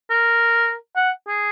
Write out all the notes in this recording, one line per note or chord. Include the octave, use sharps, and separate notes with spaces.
A#4
F#5
G#4